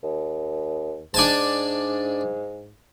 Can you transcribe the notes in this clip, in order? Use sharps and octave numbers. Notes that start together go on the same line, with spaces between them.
D#2
G#2 D4 G#5 A5